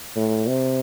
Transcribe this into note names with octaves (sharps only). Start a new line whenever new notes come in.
A2
C3